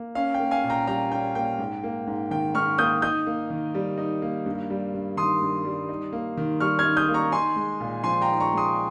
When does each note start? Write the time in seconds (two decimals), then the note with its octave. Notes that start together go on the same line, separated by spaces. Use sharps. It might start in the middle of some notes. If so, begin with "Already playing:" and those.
Already playing: A#3
0.15 C#4 F5
0.34 G5
0.39 A#3
0.51 F5 G#5
0.64 A#2
0.70 G5 A#5
0.87 G3 G5 A#5
1.12 C#4 G5
1.35 A#3 G5
1.59 G#2
1.84 A#3
2.07 G#2
2.31 D#3 G5
2.55 G#2 C#6 F6
2.78 A#3 D#6 G6
3.02 D#4 D#6 G6
3.27 A#3
3.50 D#3
3.75 G3
3.98 D#4
4.22 A#3
4.46 G2
4.70 G3
4.94 G2
5.17 D#3 C6 D#6
5.42 G2
5.65 G3
5.89 D#4
6.13 A#3
6.37 D#3
6.60 G3 C#6 F6
6.79 F6 G#6
6.85 D#4
6.97 D#6 G6
7.08 A#3
7.14 A#5 C#6
7.32 D#4 G#5 C6
7.56 G#3
7.80 A#2
8.04 F3 G#5 C6
8.22 G5 A#5
8.28 D#4
8.40 A#5 C#6
8.52 G#3
8.57 C6 D#6